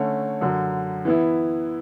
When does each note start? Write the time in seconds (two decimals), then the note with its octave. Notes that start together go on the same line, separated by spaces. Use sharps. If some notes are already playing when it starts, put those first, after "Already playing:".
Already playing: D3 A3 C#4
0.41 F#2 D3 F#3
1.05 E3 B3 E4